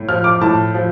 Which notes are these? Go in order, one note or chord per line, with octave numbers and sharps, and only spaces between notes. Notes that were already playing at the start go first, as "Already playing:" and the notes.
Already playing: A2
F3 F6
D6
A2 A5
F3